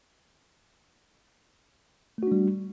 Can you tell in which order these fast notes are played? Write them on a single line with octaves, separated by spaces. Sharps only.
A3 F#4 D4 G3